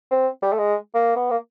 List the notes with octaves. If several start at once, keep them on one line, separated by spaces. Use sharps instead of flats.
C4
G3
A3
G#3
A#3
B3
A#3